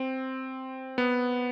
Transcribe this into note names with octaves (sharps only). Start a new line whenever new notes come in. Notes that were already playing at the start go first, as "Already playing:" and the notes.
Already playing: C4
B3